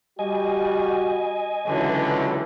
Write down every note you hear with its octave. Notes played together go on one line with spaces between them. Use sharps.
G3 F#4 D#5 G#5
C#2 D3 E3 F#3